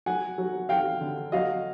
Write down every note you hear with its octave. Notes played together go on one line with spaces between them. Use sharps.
F#3 F#5 G#5
F#3
F#3 F5 G5
D3
F#3 D#5 F5